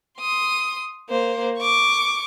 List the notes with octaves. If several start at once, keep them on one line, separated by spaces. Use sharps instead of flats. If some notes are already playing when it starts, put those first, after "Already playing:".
C6 D#6
A#3 C5
C#6 D6